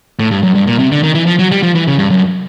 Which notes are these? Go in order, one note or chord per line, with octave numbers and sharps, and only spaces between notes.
A2
G2
F#2
G2
A#2
C3
D3
D#3
E3
F3
F#3
G3
F3
E3
C#3
G2
F#2